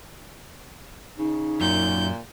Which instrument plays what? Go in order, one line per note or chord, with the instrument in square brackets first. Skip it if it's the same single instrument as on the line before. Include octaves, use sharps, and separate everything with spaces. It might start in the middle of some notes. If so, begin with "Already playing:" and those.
[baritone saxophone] C#3 [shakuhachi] D#4
[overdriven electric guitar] F#2 [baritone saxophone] A#2 [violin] G6